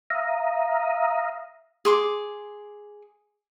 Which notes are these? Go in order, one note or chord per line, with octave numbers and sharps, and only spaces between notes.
E5 F5 A#5 D#6
G#4 C6 D6